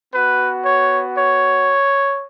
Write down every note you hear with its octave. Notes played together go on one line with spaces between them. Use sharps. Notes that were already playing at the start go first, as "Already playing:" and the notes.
B3 F#4 B4
C#5
C#5